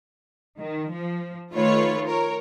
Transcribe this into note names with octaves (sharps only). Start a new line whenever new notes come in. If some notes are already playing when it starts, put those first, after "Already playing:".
D#3
F3
D#3 A3 F4 B4 C#5
A#4 C#5